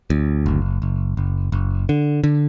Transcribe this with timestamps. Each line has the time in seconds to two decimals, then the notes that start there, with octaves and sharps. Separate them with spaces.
0.10 D2
0.46 F#1
0.82 F#1
1.17 F#1
1.52 F#1
1.89 D3
2.24 D3